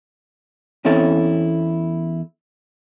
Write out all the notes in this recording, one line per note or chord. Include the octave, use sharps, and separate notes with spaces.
E2 C4 C#4 E4 A4